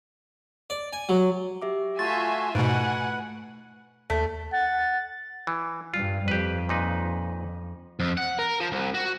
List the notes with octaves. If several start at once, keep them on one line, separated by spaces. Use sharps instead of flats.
D5
G#5
F#3
G4 E5 D6
A3 F4 F#4 E5 G#5 C6 A6
G#2 B2 A3 B4 F#5 G#5 D7
D#2 A3
F#5 A6
E3
G2 G3 F4
F2 G4 B4
A#2 D#4 B4
F2
F#5
A#4
F3
C2
F#4